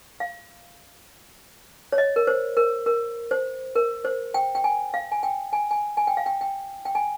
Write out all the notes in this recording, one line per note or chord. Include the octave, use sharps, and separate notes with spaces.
F5
C#5
D#5
A#4
C5
A#4
A#4
C5
A#4
C5
G5
G5
G#5
F5
G#5
G5
G#5
G#5
G#5
G5
F5
G5
G5
G5
G#5